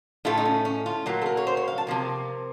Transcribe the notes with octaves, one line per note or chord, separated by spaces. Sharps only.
A2 A3 F4
D#4
C#4
C#4
F4
A#2 F#3 A#3
A4
A#4
C#5
C5
C#5
F5
A5
C3 F3 A#3